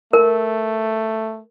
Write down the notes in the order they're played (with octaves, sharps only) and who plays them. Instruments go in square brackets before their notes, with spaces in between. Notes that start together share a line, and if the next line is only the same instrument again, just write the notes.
[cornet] A3 [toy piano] A#4